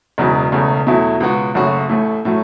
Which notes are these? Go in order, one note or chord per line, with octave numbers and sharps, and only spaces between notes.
E1 E2 C#3 F#3
E1 E2 C#3 A3
E2 B2 F#3 A3 E4
C#2 B2 B3 F#4
F#1 F#2 C#3 A3 F#4
A1 A2 A3
A2 F#3 A3